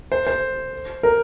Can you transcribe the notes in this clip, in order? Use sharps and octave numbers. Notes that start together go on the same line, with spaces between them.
C5
C5
A#4